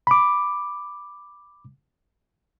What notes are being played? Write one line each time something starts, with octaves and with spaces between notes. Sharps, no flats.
B5 D6